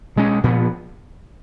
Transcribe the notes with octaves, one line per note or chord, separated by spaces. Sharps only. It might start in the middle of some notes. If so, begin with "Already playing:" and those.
B2 G#3 C#4
A#2 F3 B3